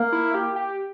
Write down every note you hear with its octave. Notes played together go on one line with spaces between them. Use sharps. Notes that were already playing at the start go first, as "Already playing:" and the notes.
Already playing: A#3
E4
G4
G4